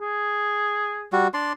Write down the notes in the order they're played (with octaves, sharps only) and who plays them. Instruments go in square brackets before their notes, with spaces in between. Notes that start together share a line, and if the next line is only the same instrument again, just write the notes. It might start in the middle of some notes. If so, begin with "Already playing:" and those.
[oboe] G#4
[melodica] G3 F#4
D4 D5 C6